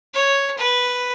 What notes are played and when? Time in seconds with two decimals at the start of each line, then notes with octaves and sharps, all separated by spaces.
0.14 C#5
0.57 B4